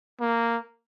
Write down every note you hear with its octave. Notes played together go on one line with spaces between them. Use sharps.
A#3